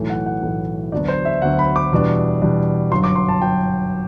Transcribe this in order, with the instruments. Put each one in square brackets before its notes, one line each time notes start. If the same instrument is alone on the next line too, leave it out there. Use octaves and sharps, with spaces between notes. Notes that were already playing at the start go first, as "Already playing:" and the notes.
Already playing: [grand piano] B1 A2 E3 A3
F#5
F#5
B1 A2 E3 A3
D2 D3 F#3 B3 D4 D5
C5
E5
D2 D3 F#3 B3 D4 F#5
B5
D6
E2 B2 G3 D4
E2 B2 G3 D4
G1 F#2 F#3 C6
D6
C6
A5
F#3 G5